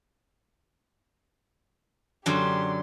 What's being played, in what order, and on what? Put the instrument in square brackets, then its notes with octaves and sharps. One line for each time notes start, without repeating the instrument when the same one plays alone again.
[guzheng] F#2 D3 F#3 [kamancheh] G4 C6